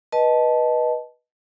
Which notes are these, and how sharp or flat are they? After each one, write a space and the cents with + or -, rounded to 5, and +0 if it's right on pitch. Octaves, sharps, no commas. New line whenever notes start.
B4 -20 D#5 +0 A5 -10